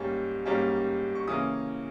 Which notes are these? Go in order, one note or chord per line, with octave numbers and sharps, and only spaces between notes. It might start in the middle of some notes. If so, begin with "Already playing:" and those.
Already playing: G#2 G3 A#3 C#4
G#2 G3 A#3 C#4
C#6
C#3 E3 A#3 C#4 D#6